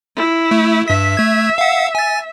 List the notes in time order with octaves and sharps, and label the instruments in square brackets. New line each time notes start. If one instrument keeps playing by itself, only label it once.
[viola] E4
[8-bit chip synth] A3
[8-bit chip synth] G2 B6 [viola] E5
[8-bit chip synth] A3 G#6
F5 F#5
G#5 A6